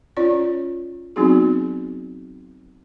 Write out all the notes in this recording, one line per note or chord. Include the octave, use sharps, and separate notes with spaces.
C#4 F4 C#5 D5
F#3 B3 C4 D#4 F#4 G#4